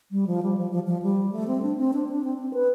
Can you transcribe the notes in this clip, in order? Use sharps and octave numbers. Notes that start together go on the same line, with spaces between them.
G3
F3
G3
F3
F3
F3
G3
A3
C4
D4
C4
D4
D4
C4
C4
B4